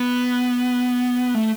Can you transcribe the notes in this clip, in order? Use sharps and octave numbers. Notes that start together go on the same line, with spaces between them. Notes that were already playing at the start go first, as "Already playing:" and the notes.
Already playing: B3
A3